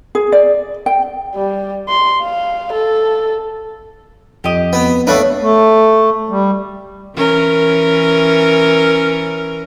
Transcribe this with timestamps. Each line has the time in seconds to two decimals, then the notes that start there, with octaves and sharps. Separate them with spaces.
0.15 G#4
0.32 D5
0.86 G5
1.35 G3
1.89 C6
2.22 F5
2.73 A4
4.44 F2 G4 D#5
4.73 B3
5.07 A3 B3 D4 B4 C#5 F5
5.42 A3
6.30 G3
7.15 E3 C#4 A#4